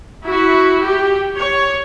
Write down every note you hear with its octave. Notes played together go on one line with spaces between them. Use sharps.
E4 F#4
G4
C#5